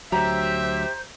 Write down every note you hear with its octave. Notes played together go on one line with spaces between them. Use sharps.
D2 F#3 G4 C5 E5 A#5 G6